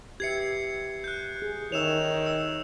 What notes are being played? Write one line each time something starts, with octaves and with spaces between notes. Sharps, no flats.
G4 B4 E5 G#6 C7 C#7
F#6 G6
G#4
D#3 C#5 E5 E6 E7 F7
E6